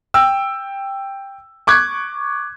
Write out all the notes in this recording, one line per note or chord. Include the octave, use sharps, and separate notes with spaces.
G5 E6
C#6 D6 F#6 G#6